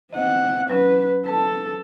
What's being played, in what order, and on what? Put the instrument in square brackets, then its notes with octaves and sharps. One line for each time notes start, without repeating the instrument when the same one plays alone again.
[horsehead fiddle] C4 F#5 [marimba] D#5
[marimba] F#3 C#4 [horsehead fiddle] B4
[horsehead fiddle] A4 [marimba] B4 A5